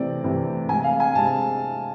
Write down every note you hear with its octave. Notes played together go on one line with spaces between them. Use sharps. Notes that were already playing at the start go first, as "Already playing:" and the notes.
Already playing: C3 E3 A3 C4 D5
C3 E3 A3 C4
C3 G#3 C4 G#5
F5
G#5
C3 G#3 C4 A5